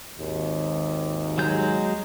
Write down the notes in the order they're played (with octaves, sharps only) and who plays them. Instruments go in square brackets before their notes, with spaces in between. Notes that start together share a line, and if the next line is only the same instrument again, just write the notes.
[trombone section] G#1 D#2
[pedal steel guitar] F#3 G#3 G6